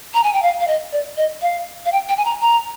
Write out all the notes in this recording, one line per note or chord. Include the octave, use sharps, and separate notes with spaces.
A#5
G#5
G5
F5
F5
D#5
D5
D#5
F5
F5
G5
G5
G#5
A#5
A#5